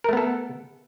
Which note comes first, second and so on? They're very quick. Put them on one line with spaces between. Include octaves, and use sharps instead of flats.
A#4 A3 B3 A4